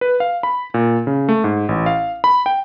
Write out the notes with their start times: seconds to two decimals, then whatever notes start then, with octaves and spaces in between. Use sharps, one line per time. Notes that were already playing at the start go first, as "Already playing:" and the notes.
0.01 B4
0.20 F5
0.43 B5
0.74 A#2
1.07 C#3
1.29 A3
1.44 G#2
1.69 A1
1.86 F5
2.24 B5
2.46 G5